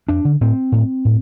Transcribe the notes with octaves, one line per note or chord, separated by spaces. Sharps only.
F2 D4
D3
A2 C4
A2
A2